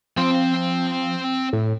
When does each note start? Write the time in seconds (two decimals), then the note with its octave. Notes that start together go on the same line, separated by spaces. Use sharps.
0.17 F3 C4 C6
1.53 A2